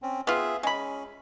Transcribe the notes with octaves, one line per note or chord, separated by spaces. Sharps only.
C4 C#4
B3 F4 G#4 E5
G#3 C#4 B5